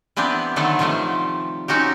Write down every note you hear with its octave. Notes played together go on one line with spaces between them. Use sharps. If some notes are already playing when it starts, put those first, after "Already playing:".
E3 B3 C4 D4 G4
D3 D#3 F#3 A3 B3 A4
C3 D#3 F3 G3 A3
C4 C#4 D#4 F#4 G4